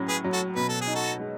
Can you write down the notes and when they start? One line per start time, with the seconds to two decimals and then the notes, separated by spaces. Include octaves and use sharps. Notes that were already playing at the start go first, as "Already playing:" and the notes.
Already playing: A2 F#3 C#4
0.08 G#4 B4
0.24 F#3
0.33 F#4 A4
0.56 B2 B4
0.69 A4
0.81 G#4
0.87 D#4
0.95 F#4 A4
1.20 G#3